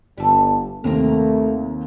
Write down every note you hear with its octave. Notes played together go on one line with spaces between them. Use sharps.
G1 G3 A4
D#2 C3 A3 A#3 C4 A#4